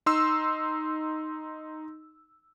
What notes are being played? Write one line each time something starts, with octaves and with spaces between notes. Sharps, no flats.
D#4 C6 E6